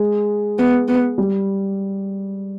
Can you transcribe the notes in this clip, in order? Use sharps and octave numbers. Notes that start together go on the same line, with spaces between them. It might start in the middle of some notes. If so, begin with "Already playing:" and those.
Already playing: G#3
B3
B3
G3